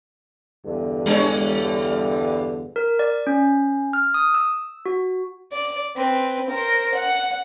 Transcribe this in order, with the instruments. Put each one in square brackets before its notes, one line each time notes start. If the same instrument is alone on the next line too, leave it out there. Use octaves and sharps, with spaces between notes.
[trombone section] E2 G2 D3
[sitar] G3 D4 C#5
[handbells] A#4
D5
C#4
F6
D#6
E6
F#4
[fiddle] D5
C4 B4
A#4 C5
F#5